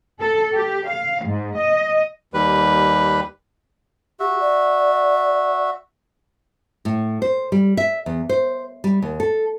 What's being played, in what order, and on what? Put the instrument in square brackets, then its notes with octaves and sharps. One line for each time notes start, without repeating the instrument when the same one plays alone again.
[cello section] A4
G4
F5
G#2
D#5
[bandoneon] D#2 G3 B4
[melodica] F#4 E5 [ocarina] G4
[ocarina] D5
[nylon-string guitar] A2
C5
G3
E5
E2
C5
G3
D#2
A4